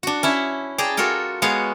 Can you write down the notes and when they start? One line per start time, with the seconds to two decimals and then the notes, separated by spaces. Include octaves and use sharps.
0.03 D4 F#4
0.23 C#4 E4 E5
0.78 G#4 D5 G5 A5 A#5
0.97 F4 F#4 A4 A#4 G5
1.42 G#3 B3 F#4 C#5 F5